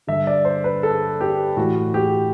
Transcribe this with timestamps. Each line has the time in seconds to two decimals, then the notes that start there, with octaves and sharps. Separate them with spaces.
0.07 G2 D3 E5
0.27 D5
0.45 C5
0.64 B4
0.83 A4
1.21 G4
1.57 A2 E3 F#4
1.94 G4